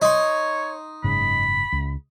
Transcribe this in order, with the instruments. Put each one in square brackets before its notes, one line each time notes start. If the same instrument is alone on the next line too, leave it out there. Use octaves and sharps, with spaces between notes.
[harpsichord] D#4 C6 [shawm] C#5
[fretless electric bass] F#1 G#2 C#3 [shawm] B5
[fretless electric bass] C#2